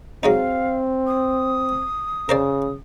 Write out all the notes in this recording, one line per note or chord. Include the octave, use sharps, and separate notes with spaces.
F#3 G#3 C4 D#4 F5
D#6
C#3 A#4 C5 D5